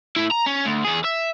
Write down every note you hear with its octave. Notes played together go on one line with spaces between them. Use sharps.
A2 E4
A#5
C#4
D2
E2 G#4
E5